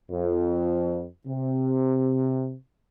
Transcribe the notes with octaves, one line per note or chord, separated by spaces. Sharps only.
F2
C3